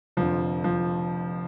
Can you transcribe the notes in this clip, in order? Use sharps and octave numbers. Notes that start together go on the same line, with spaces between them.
F1 F2 D3 F3
F3